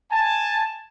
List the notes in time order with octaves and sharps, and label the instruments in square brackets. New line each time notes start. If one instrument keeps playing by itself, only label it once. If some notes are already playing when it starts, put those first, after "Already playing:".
[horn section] G#5 A5